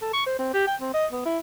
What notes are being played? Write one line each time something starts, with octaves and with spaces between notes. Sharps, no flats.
A4
C#6
C5
C4
G4
G5
C4
D#5
B3
E4